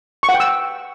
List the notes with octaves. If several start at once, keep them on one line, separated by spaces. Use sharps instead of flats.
C#6
F#5
G5
E6